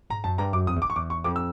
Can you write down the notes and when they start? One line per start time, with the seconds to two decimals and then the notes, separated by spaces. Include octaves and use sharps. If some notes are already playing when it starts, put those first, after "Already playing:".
0.10 G#2 A#5
0.24 F#2 A5
0.38 G2 A#5
0.53 F#2 D6
0.67 F2 D#6
0.76 E2
0.82 D6
0.85 F2
0.90 C#6
0.96 E2 D6
1.10 C#6
1.24 F2 D6
1.36 E6